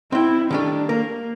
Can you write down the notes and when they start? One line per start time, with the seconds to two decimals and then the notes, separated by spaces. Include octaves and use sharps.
0.12 C4 E4 G5
0.51 D#3 G3 A3 D4
0.89 A#3 A#4